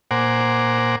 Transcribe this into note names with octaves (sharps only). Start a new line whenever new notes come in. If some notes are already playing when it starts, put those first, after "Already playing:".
A#2 C5 F#5 G#5 A#5 D6